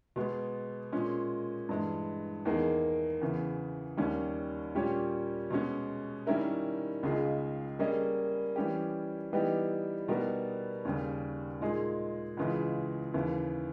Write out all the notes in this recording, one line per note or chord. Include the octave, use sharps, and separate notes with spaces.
B2 G#3 B3
A#2 G#3 C#4
G2 E3 G#3
E2 D#3 A#3 D#4 G#4
E2 C#3 E3
D#2 D#3 G3 C#4
A#2 G3 C#4 G4 C#5
B2 G#3 C#4
D#3 G3 C#4 E4 A#4
C#2 C#3 G#3 D#4 G#4
G3 A#3 C#4 G#4 D#5
E3 G3 C#4 G4
E3 G3 B3 D#4 G4
B2 G3 B3 D#4 A#4
D#2 C#3 G3
A#2 G#3 D#4 G#4
C#2 C#3 E3 G#3
D#2 C#3 E3